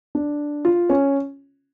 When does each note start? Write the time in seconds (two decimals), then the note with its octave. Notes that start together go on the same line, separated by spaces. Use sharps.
0.15 D4
0.65 F4
0.90 C#4